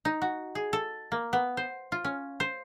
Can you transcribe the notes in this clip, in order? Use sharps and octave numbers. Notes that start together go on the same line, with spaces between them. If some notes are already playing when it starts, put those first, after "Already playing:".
D#4
F#4
G#4
A4
A#3
B3
C5
F4
C#4
C5